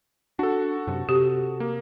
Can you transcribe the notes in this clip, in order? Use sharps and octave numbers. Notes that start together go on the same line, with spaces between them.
D4 F#4 A4
F#2 C3
C3 G4
A#3